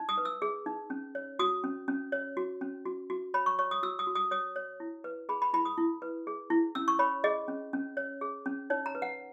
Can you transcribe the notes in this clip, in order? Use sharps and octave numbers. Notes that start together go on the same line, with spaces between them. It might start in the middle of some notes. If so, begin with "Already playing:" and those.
Already playing: D#4
D#6
B4
E6
G#4
D#4
C#4
C#5
F#4 D#6
C#4
C#4
C#5
F#4
C#4
F#4
F#4
C#5 B5
C#6
C#5 C#6
D#6
F#4 E6
D#6
F#4
D#6
C#5 D#6
C#5
E4
B4
G#4 B5
B5
E4 B5
D#6
E4
B4
G#4
E4
C#4 E6
C#6
C#5 B5
G#4 D#5
C#4
C#4
C#5
G#4
C#4
D#4 C#5
A#5
B4
F#5